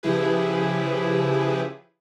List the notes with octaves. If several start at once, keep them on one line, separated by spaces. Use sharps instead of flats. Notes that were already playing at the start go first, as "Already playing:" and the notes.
C#3 F3 E4 G4 G#4 B4